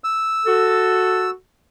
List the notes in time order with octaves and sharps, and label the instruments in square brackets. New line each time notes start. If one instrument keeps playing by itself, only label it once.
[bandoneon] E6
[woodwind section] F#4 A4